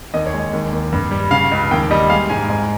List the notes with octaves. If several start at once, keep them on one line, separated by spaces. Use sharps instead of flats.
D#2 D#5
C#5
G#3
D#5
D#2
D#2
G2
G3
C#3 F5
C#2
D#2 G5
G3 D#5
G#3 F5
G#2 G#5
G#2 G#5